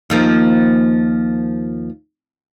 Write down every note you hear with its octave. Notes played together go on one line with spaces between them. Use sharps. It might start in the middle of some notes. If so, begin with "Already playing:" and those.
D#2 F3 A#3